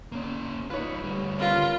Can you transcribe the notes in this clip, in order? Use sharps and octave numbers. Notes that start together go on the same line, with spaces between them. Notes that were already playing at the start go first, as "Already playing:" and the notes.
A#3 C#4
D#4 F4 B4 C#5
D2 G3
C#4 F4 A#4 B4